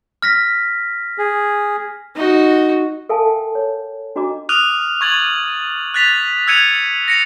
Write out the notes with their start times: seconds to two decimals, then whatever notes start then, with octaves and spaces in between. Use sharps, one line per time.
0.22 F6 A#6 B6
1.18 G#4
2.16 D#4 F#4
3.09 A4 A#4 E5 F5 G#5 A5
3.26 F5 G5
3.55 C#5
4.16 D4 F#4 D#5 A#5 D6
4.49 D6 D#6 F6 F#6 D#7 F7
5.01 C#6 G#6 A6 F#7
5.94 F#6 G#6 A6 B6 F7
6.47 E6 F#6 G#6 C#7 D#7 F7
7.08 A#6 C#7 F7